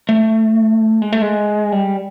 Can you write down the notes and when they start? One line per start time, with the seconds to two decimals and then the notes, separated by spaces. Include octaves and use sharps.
0.09 A3
1.02 G#3
1.12 A3
1.22 G#3
1.72 G3